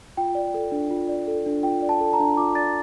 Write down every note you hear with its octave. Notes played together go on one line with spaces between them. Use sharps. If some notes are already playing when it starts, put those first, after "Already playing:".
F4 G5
D5
A4
D4
F4
D5
A4
D4
F4 G5
D5
A5
A4
A#5
D4
F4 D6
D5 A6